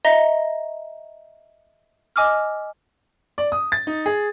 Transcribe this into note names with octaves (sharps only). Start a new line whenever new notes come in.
D#5 E5 A#5 A#6 G7
D#5 G#5 D6 E6 F6
D5
D#6
A6
D#4
G#4